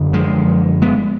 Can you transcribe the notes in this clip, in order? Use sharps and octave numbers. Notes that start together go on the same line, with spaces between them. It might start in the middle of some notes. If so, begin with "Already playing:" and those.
Already playing: F#2 D3
F3 G#3
G#3 B3